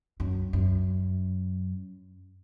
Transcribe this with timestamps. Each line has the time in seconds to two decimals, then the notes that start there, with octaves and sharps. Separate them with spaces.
0.20 F#2
0.53 F#2